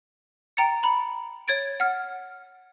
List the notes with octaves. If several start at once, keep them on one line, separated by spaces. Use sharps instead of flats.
G5 A#5 A6 C#7
A#5 B5
C#5 G#6 A6 D7
F#5 F6